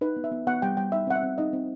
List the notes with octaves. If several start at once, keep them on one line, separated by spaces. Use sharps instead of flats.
D#4 B4
B3
E5
B3
B3 F#5
G3 G5
G3 G5
D#4 E5
C4 F#5
E5
C4
D#4 D#5
C4